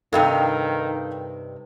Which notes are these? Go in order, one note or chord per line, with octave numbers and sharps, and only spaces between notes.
G2 C3 D#3 D#4 A4 F5 G5